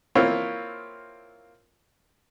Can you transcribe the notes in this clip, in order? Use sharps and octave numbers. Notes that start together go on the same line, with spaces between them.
A#3 C4 E4 F4 C#5